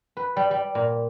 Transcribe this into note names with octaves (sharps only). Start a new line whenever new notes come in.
B4
G3
G3
A#2